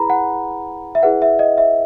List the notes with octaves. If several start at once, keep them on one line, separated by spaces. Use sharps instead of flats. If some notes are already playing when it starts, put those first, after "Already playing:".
Already playing: E4 G#4 B4 A#5 B5
F#5
E5
E4 G#4 B4 F#5
E5
D#5
E5